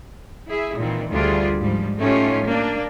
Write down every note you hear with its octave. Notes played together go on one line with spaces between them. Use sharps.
E4 G#4 E5
A#2 D#3 E3 C4
D2 G3 D4 F4 G#4
G#2 F3 G3
A2 A3 C#4 D#4 F4 G4
A#3 D4